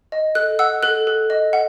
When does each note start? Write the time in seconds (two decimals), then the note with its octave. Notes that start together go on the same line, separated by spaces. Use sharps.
0.12 D#5
0.35 A4 F#6
0.59 F#5 E6
0.83 A4 F#6
1.07 A4
1.30 D#5
1.53 F#5